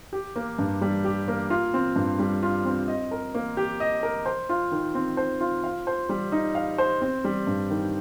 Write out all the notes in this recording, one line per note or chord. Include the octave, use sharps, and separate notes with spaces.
G4
A#3
G2
G3
G4
A#3
F4
C4
G2
G3
F4
C4
D#5
A#4
A#3
G4
D#5
A#4
C5
F4
D#3
C4
C5
F4
F5
C5
G3
D#4
F5
C5
C4
G3
G2
D#3